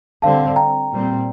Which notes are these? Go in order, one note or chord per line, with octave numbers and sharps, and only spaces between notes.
D3 G3 C4 F5 A5
G5 A#5
A#2 G3 C4